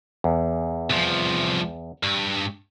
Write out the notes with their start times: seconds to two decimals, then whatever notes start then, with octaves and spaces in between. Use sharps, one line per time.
0.24 E2
0.90 C2 F3
2.03 G2